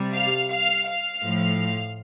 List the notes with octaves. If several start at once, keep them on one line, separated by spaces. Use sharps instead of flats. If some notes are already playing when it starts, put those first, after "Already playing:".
Already playing: C3 G3
F5
F5
F5
A2 F3